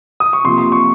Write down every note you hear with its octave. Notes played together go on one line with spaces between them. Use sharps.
D#6
C#6
C3 F3 A#3 C6
C6
C#6